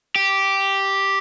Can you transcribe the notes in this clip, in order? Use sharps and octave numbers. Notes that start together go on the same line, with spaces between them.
G4